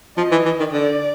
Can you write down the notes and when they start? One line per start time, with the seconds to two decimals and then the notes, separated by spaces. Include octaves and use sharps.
0.17 F3 D#5
0.32 E3
0.45 E3
0.60 D#3
0.72 D3 D5